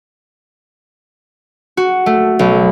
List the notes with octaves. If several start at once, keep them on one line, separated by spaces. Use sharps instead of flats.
F#4
A3
B1